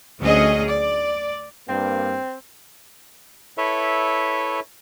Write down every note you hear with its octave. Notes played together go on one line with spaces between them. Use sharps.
D2 F#3 C#4 G#4 D#5
D5
G2 A#3 C4
E4 A4 B4 C#5 E5